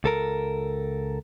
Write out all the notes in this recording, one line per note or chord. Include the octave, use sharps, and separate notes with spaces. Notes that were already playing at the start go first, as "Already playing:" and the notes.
C#2 A4 A#4